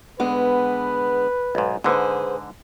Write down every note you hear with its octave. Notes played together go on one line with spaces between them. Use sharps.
D3 G#3 B3 B4
B1 G#2
G#2 D3 G#4 B4 C5